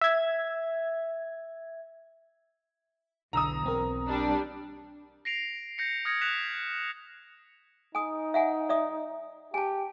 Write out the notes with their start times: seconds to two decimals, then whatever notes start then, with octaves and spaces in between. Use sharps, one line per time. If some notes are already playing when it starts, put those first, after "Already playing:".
0.01 E5 G#6
3.33 B1 E2 D3 A#5 D#6 E6
3.63 B1 C4 A#4
4.08 G3 D4
5.25 A#6 C7 D7 F7
5.78 G6 A#6 C#7
6.05 D#6 F6 G#6 A#6 C#7
6.21 F#6 B6 E7 F7
7.95 D#4 G#5 D#6
8.34 E5 F#5 G#5
8.69 D5 E5 D#6
9.54 G4 G#5 A5